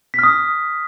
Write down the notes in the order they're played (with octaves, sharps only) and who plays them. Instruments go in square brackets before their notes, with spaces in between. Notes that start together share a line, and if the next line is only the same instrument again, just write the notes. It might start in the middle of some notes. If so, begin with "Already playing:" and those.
[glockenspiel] B6
F6
D#6